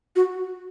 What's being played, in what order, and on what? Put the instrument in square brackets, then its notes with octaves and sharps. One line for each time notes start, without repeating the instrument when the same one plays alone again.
[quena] F#4